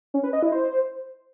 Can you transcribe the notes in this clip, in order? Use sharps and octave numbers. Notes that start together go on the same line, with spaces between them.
C#4
B4
D#5
E4
C5